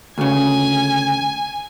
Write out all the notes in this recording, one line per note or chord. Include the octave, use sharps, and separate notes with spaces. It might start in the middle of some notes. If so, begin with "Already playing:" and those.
D2 C#3 G#5